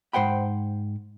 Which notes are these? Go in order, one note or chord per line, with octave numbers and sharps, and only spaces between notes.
G#2 C5 F#5 G5 B5